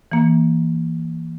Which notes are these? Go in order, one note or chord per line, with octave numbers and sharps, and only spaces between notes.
E3 A#3